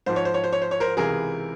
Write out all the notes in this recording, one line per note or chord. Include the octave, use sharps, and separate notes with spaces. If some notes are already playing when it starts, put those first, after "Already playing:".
G#2 F3 C5
C#5
C5
C#5
C5
C#5
C5
C#5
A#4 C5
C#2 C3 E3 G#4 A#4